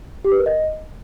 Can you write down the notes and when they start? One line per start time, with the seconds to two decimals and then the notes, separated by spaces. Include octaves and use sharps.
0.25 G4
0.32 B4
0.39 A#4
0.46 D#5